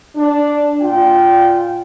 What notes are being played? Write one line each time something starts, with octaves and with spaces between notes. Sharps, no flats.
D4
A#2 F4 G5